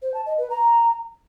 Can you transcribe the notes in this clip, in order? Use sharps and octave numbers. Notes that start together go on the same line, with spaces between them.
C5
A5
D#5
B4
A#5